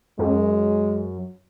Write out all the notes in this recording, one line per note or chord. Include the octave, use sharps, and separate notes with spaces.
F#2 G#3